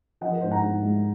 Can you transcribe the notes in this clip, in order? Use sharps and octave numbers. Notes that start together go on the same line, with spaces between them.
F3 D#5 F#5
A#4
G#2 C5
F#5 A#5
G#2
G#3